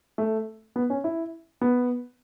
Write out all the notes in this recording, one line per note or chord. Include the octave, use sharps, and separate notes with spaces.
A3
B3
C#4
E4
B3